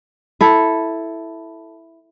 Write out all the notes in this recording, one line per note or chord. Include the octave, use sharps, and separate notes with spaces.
E4 A4